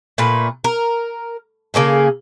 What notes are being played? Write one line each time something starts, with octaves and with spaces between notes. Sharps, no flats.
A#2 A3 B4
A#4
C#3 A#3 G#4 A4